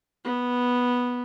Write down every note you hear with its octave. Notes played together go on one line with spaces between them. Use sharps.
B3